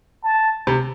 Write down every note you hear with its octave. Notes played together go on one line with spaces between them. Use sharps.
A5
C3